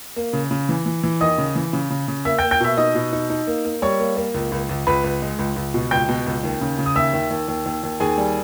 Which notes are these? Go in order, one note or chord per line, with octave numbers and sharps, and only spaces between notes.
A#3
C#3
C#3
E3
E3
E3
D#2 D#5 D#6
C#3
E3
C#3
C#3
C#3
A#3 E5 E6
G5 G6
A#3
G5 G6
B2 E5 E6
D#4 D#5 D#6
B2
D#4
D#4
A#3
A#3
G3 C#5 C#6
A#3
A#3
C#2
C#2
C#2
C#2 B4 B5
C#2
G#3
C#2
C#2
B2
C#2 G5 G6
B2
C#2
D#2
C#3
C#3
D#6
D#2 E5 E6
D#2
D#2
D#2
D#2
D#2
D#2 G#4 G#5
G3